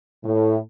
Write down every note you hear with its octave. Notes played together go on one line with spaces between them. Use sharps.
A2